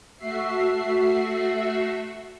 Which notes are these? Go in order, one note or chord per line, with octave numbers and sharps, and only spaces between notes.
A3 F#4 E5 C7